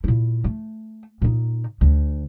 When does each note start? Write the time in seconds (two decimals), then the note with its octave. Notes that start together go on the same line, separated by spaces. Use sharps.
0.04 A#2 E4
0.44 A3
1.22 A#2 D#4
1.81 D2